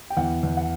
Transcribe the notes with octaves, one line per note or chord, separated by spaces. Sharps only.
G5
E2 F#5
E2
F#5